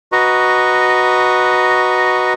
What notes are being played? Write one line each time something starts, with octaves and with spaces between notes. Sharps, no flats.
F#4 B4 D#5 A#5 C#6